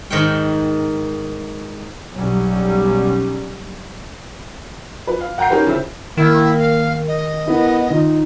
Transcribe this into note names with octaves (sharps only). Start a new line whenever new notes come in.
G#2 D#3 D#4 A#4 C#5 G5
B1 F#3 G3 C#4
F3 B4
F5
F#5 G5 A#5 G6 C7
C#4 D#4 G4 A#4 B4
C#3 E3 F3 C4 E5
D#3 A#3 E4
F5
D#5
B3 E4 A#4
D#3 D#4 F4